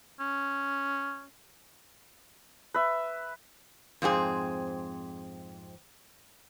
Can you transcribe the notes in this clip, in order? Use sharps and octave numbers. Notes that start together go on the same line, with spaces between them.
C#4
B4 E5
F2 G#2 C4 G#4